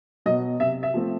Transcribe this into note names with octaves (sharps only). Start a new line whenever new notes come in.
B2 F#3 D#5
C3 E5
E5
F3 A3 C4